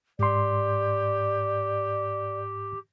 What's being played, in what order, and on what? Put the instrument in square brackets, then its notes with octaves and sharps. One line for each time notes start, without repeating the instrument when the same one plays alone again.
[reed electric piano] G#2 C6 [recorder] G4 [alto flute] D5